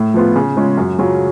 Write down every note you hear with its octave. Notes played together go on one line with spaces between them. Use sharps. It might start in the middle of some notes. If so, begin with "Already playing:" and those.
Already playing: A2
F3 B3 F4
C#3
G#3 C#4 F4
F#2
C#3 F#3 C#4 F4